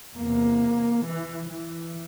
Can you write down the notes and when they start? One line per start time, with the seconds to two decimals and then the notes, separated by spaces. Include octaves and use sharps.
0.16 E2 C3 A#3
1.06 E3
1.51 E3